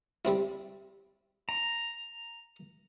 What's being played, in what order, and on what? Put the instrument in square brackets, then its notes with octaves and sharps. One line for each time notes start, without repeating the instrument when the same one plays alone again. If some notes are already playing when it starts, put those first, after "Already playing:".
[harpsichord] G3 C4 E4
[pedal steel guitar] A#5